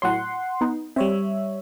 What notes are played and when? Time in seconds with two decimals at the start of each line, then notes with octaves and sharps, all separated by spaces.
0.02 A2 F#3 C#5 F#5 C6
0.61 B3 D#4
0.96 G3 C4 C#5 E5